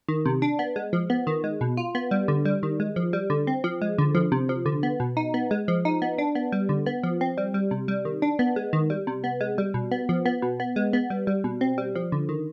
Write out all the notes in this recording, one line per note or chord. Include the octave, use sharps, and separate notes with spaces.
D#3
C3
D4
B3
G#3
F3
B3
D#3
G#3
B2
F4
B3
G3
D3
G3
D#3
G#3
F3
G3
D3
C4
F3
G#3
D3
F3
C3
F3
D3
B3
B2
D#4
B3
G#3
F3
D#4
B3
D4
B3
G3
D3
B3
F3
C4
G3
G3
C3
G3
D#3
D4
B3
G#3
D#3
G3
C3
B3
G#3
G3
B2
B3
F3
B3
B2
B3
G#3
B3
G3
G3
B2
C4
G3
F3
D3
D#3